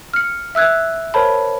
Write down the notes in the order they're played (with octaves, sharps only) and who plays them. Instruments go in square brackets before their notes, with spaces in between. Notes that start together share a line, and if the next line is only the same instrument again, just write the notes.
[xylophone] F6 C#7
E5 E6 F#6 G#6
A#4 C5 C#5 A5 B5